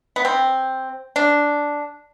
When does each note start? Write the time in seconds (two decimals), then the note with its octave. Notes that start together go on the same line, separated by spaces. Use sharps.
0.16 B3
0.25 C4
1.16 D4